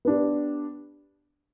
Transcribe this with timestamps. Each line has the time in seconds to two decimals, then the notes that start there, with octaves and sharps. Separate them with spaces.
0.05 B3 D4 G4